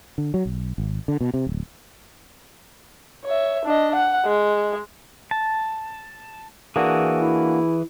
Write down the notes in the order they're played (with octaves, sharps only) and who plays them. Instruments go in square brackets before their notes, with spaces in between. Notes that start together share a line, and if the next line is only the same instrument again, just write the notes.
[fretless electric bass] D3
F#3
B1
G#1
D3
B2
C3
D1
[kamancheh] C#5 E5
D4 D#5
F#5
G#3
[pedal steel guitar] A5
[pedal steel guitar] E3 G#4 [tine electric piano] A#3 D4 F#4
[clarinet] E4